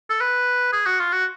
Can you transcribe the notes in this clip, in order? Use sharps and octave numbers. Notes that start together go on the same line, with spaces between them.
A4
B4
G#4
F#4
F4
F#4